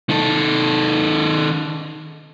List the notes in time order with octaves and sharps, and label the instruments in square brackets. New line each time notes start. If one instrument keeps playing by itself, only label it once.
[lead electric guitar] D#3 A4